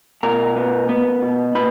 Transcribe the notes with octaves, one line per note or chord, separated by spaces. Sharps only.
B2 A#4 A#5
B3
B3
B2
A#2 B4 B5